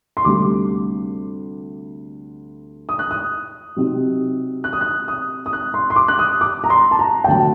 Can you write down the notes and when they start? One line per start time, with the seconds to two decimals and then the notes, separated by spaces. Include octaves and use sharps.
0.17 C6
0.25 D2 C3 G3 D6
2.89 D#6
2.99 F#6
3.11 D#6
3.77 C3 F#3 C4 D#4
4.64 F#6
4.73 D#6
4.81 F#6
5.08 D#6
5.46 D#6
5.53 F#6
5.74 C6
5.90 C6
5.96 D6
6.08 F#6
6.19 D#6
6.41 D6
6.64 A#5
6.70 C6
6.91 A5
6.99 A#5
7.24 G5
7.28 D2 C3 F#3 A5